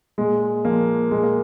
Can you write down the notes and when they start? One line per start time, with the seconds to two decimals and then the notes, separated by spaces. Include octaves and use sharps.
0.18 A#2 G#3
0.65 F3 A#3
1.11 A#2 G#3
1.23 A#3